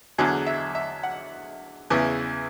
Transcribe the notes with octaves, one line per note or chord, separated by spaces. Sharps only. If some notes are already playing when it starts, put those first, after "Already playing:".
E2 D3 F#3 G#4
E5
E5
F#5
E2 C#3 E3